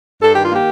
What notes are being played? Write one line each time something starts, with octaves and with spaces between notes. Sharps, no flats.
G2 A4
D#3 G4
F4
A#3 G4